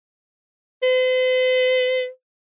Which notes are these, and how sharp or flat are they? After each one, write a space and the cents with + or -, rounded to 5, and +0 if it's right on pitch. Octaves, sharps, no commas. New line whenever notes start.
C5 -45